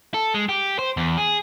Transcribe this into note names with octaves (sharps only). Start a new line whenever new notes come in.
A4
G#3
G4
C5
E2
G#4